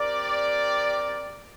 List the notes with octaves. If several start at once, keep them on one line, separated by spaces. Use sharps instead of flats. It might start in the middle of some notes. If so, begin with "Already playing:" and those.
Already playing: C4 G4 A#4 D5